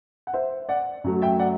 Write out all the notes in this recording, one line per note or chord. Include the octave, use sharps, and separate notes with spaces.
F#5
C5 E5
D5 F#5
F#2 F#3 A3
E5 G5
D5 F#5